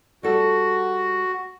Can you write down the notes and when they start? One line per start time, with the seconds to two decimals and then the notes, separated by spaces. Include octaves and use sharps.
0.23 G3 F#4 A4